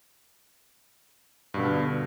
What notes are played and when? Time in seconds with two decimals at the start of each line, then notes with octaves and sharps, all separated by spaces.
1.54 G2
1.57 B2
1.59 D3